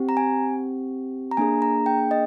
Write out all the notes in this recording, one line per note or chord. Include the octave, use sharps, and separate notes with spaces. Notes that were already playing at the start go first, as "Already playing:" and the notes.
Already playing: C4 G4
A#5
G#5
A#5
A#3 D4 G#4 G#5
A#5
G5
D#5